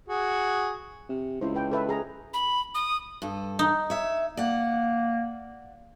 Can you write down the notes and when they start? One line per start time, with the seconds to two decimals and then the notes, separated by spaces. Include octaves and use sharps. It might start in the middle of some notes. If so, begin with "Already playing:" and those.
0.09 F#4 G#4
1.09 C3
1.41 C#2 E4 C5
1.55 B4 G5
1.72 A4 B4 E5
1.89 G#4 A#5
2.34 B5
2.75 D#6
3.22 G2 A4
3.59 D#4
3.90 C#5 E5
4.37 A#3 D5 F#5